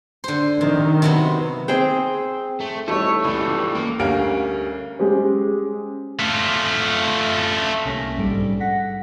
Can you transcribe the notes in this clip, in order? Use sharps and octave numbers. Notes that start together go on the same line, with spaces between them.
D3 C5
C3 D#3
C3 F#3 B3
C4 G#4 C5 G5
A3
E3 G3 A3 D#4 C5 C#5
C#2 E3 G3
A#3
D2 G3 C#4 A#4 F5 D7
G#3 C#4 G4 C5
A3 F4
C2 C3 A#3 C#4 A#6 B6
A#1 G#2 G3 A4 D7
F#5 A#6 B6